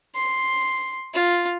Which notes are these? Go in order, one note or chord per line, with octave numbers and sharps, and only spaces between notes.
C6
F4